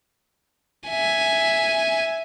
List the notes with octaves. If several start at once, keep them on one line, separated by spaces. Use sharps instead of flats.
E5 G#5